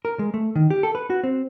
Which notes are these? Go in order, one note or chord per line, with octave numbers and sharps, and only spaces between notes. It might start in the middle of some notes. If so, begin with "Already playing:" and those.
A#4
G#3
A3
D#3
G4
A4
B4
F#4
C4